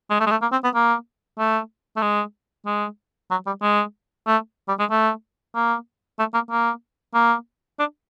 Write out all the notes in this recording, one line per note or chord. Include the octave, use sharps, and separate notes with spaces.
G#3
A3
G#3
A3
A#3
C4
B3
A#3
A3
A3
G#3
G#3
F#3
G3
G#3
A3
G3
G#3
A3
A#3
A3
A#3
A#3
A#3
D4